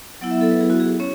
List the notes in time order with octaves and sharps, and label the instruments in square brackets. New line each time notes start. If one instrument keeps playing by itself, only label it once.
[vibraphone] F#3 B3 E4 F#5
E5
A4
B4
G#4
F#4
G#4
C#4 C#5